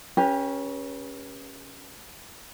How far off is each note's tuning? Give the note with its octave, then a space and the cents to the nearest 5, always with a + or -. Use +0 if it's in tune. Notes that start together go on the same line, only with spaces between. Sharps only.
C#4 +0 G4 +25 B4 -40